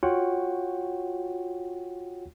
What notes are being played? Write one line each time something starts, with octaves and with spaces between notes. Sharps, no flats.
F4 F#4 C#5 F#5 G5